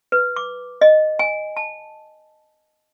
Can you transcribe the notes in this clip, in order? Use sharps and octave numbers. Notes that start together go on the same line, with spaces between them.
B4
D6
D#5
G#5
A5